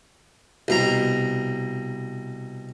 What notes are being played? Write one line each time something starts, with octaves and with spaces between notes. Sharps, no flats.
C2 B2 A#5